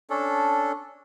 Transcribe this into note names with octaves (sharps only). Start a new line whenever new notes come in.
C#4 D4 A4